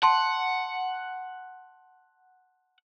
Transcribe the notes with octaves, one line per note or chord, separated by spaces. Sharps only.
F#5 A5 C6